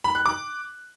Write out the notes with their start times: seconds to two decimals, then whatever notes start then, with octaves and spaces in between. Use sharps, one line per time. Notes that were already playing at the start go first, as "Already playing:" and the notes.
0.04 B5
0.15 F#6
0.26 D6